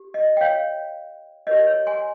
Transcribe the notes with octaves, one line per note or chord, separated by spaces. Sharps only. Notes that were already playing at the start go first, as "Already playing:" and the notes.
Already playing: G4
D#5
G5
C#5 F5
G4 A#4 C#5 D#5
C#5
G#5 C6